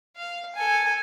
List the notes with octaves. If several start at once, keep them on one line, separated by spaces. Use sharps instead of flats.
F5
A4 G#5